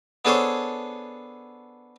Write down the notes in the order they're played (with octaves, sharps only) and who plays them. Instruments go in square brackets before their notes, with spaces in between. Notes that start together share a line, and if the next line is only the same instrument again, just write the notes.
[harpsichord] B3 D4 G#4 A4 C5 C#5